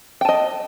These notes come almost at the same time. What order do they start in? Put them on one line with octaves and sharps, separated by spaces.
G5 A5 D#5